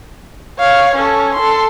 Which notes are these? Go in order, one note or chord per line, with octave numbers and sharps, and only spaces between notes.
C#5 F5
C#4 A4
A4 C6